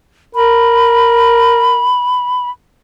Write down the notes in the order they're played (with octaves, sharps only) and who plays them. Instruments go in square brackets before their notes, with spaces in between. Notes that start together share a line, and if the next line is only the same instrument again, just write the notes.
[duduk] A#4 [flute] B5